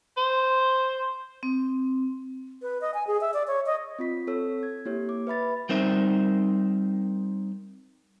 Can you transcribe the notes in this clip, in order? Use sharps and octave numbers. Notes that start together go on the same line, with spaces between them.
C5
C4
B4
D#5
G#5
G#4
E5
D5
C#5
D#5
C4 F4 B6
C4 A4 C#5 E6
G#6
A#3 E4 G4 C#5
D6
B4 E5 B5 A6
G3 C4 D#4 A#4 C5 E5